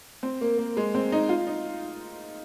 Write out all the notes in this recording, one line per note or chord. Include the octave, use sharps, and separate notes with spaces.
C4
A#3
A#3
G#3
C4
D#4
F4
D#4